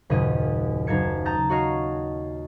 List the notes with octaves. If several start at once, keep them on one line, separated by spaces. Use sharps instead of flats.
F#1 D#2 A#2 G#4 D#5 D#7
F#1 D#4 F5 A5 G#6 C#7
A5 A#5 D#6 G6 A6
F#4 C#5 D#5 F5